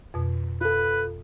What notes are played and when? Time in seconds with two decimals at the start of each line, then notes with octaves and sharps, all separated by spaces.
0.14 F2 B2
0.61 F4 A4 B4